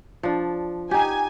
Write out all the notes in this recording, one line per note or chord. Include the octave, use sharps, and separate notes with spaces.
F3 D4
D#4 G4 G#5